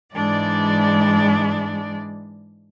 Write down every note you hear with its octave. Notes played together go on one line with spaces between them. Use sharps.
G#2 E3 G#3 D4 D5